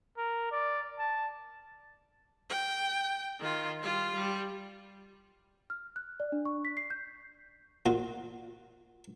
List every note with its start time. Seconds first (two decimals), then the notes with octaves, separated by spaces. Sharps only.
0.17 A#4
0.51 D5
0.99 A5
2.49 G5
3.40 D#3 F4
3.82 G3 F4
4.15 G3
5.70 F6
5.96 F#6
6.20 D5
6.32 D4
6.45 C#6
6.65 B6
6.77 C7
6.90 G6
7.86 A#2 F4 F#4